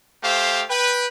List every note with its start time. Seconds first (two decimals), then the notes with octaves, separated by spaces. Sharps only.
0.23 A3 G4 C5 F5
0.70 B4 G5